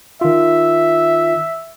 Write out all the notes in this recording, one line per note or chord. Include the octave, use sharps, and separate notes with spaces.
D#3 F4 E5